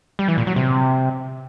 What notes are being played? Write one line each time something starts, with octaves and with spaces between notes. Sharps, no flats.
G3
E3
A#2
F#3
C3